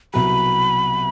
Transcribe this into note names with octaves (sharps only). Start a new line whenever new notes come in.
C2 B2 F#3 B5